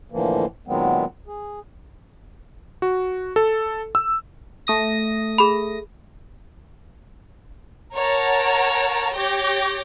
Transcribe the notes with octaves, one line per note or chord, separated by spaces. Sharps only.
A2 D3 E3 F3 A#3
A#2 D#3 F#3 G#3 B3 C4
G#4
F#4
A4
E6
A3 D#6 A#6
G#4 B5
A#4 C#5 F#5 A5 A#5
G4 C#5 D6 G6 A#6